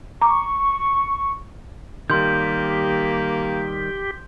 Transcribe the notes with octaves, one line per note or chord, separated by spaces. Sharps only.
A#5 C#6 D6
D#3 G3 A#3 G4 C6 G6